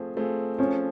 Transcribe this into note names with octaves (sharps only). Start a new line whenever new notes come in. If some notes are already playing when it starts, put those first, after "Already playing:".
Already playing: F3 A3 C4 G#4
A3 C4 F4 G#4
F3 C#4